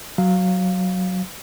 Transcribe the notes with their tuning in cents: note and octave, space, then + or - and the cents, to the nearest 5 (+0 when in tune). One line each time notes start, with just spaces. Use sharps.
F#3 +0 F5 +0